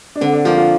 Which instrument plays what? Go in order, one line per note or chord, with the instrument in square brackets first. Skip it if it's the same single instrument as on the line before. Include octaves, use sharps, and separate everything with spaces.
[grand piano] D4
[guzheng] D3 [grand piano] C4
[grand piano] D4
[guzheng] F3 A#3 [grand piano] F4
[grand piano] F4